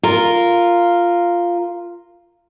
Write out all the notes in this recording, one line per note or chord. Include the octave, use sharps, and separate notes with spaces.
F4 A#4